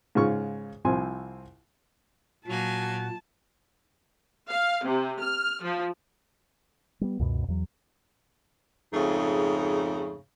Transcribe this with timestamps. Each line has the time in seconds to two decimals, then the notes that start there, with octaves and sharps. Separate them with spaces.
0.15 G#2 C#3 F4 C#6
0.85 C2 F3 C4 G#5 C6
2.47 A#2 F#3 A#3 F#4 G#5 A5
4.50 F5
4.84 C3
5.22 F6
5.63 F3
7.01 G3 B3
7.19 C#2 F#2 B2
7.48 E2 F#3
8.93 F2 G#2 C#3 A3